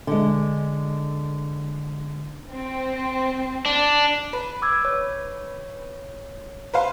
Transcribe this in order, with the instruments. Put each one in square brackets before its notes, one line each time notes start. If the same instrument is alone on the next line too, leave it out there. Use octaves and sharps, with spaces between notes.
[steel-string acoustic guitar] D3 G#3
[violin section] C4
[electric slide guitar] D4
[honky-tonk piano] B4
[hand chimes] D6 E6 G#6
C#5
[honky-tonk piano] B4 C5 F5